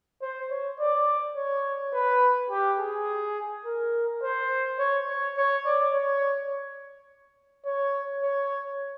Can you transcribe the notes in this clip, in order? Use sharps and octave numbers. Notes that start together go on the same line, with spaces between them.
C5
C#5
D5
C#5
B4
G4
G#4
A#4
C5
C#5
C#5
C#5
D5
C#5
C#5
C#5